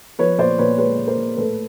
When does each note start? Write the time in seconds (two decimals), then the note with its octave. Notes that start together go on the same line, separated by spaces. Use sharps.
0.19 F3 B4 C#5
0.38 A#2 C5 D5
0.59 A#2 B4 C#5
0.78 G#3 B4 C#5
0.98 A#2
1.07 A#4 C5
1.17 A#2
1.37 A2 A4 B4